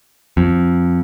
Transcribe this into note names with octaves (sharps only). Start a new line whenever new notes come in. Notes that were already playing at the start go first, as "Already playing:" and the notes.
F2